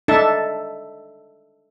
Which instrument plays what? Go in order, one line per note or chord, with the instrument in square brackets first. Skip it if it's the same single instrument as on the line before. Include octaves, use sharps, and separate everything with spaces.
[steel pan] D4 D#4 A4 E5 A5